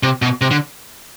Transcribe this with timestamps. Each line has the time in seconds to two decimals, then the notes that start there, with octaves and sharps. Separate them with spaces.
0.03 C3
0.22 B2
0.41 C3
0.51 D3